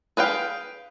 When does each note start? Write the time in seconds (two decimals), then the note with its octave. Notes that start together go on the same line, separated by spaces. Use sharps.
0.17 G#4 B4 F5 G5